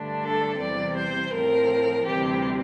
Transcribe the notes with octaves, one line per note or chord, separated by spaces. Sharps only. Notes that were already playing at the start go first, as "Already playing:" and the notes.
Already playing: G2 D3 A3 D4
A4
E2 C3 E3 G3 C4 D5
C5
A2 F3 C4 A#4
D2 C3 E3 G3 C4 G4